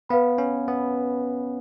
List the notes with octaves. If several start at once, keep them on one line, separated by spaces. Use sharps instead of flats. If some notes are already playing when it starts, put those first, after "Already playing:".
B3 B4 F5 B5
C#4
B3